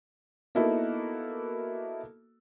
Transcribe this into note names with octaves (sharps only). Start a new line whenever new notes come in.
A#3 B3 D#4 E4 F#4 A4